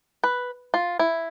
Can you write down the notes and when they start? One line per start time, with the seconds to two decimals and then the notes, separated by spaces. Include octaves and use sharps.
0.24 B4
0.74 F4
0.99 E4